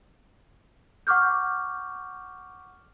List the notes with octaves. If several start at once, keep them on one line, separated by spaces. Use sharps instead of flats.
F#5 C#6 D6 F6 G6